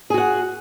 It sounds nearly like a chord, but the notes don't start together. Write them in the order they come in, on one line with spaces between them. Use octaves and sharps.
G#4 F#4 F#5